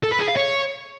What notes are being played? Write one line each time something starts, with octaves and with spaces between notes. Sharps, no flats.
A4
B4
G#4
F5
C#5